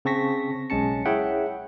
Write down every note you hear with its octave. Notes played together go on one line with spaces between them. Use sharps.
C#3 C4 A5 C#6 A#6 B6
B1 G#3 C#4 A5 C#7
E4 G#4 C#5 E5 F#5 G5